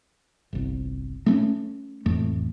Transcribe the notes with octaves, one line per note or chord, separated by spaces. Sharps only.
G1 C2
A3 B3 C#4
A1 F2 A3